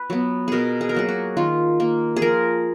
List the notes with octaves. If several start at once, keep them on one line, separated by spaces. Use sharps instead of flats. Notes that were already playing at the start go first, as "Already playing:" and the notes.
Already playing: B4
F#3 B3
B2 G#4 A#4
G#4
A#4
F#3 A#3 G#4
F#4
D#3 F4
A#3
G#4
F3 A#4